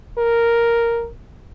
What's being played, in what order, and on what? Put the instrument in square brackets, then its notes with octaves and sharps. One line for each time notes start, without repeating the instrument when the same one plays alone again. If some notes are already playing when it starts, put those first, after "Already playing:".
[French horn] A#4